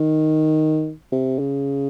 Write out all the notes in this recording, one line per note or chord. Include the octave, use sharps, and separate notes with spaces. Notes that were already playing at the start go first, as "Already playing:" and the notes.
Already playing: D#3
C3
C#3